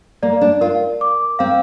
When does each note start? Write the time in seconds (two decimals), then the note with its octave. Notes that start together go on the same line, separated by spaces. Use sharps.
0.23 A#3 D5
0.41 D4
0.61 F4 A#4
1.01 D6
1.39 C4 F5